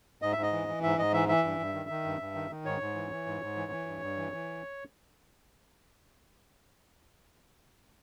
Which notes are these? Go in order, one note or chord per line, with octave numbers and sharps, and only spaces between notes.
G#2 D#5
E5
G#2
D#5
E3
E3
G#2 E5
G#2 D#5
E3 E5
E3 E5
G2
G2
D#3
D#3
G2
G2
D#3
D#3
G#2 C#5
G#2
E3
E3
G#2
G#2
E3
E3
G2
G2
E3
E3